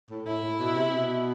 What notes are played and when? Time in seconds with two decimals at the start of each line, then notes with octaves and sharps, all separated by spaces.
0.10 A2
0.26 A2 E4
0.43 A2
0.59 B2
0.75 C3
0.91 B2